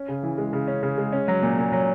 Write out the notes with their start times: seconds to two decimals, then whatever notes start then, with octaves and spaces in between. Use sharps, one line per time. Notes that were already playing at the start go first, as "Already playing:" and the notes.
Already playing: C#4
0.08 C#3
0.23 E3
0.38 G#3
0.53 C#3
0.68 C#4
0.83 C#3
0.98 G#3
1.13 C#4
1.28 F#3
1.42 A#2
1.58 A#2
1.72 F#3